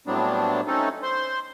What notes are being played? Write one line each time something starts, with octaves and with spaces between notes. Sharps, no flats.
A2 F#3 G3 B3 C4 D4
A3 C4 C#4 D#4 A4
C5 C6